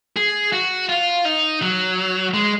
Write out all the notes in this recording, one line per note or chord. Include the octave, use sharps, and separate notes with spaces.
G#4
F#4
F4
D#4
F#3
G#3